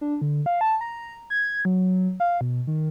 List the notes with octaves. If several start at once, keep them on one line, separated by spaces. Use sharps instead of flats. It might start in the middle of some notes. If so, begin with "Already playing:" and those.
D4
D3
F5
A5
A#5
G#6
F#3
F5
B2
D#3